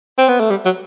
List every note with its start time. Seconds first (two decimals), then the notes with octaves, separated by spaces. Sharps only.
0.18 C4
0.29 B3
0.40 A3
0.50 G3
0.65 F#3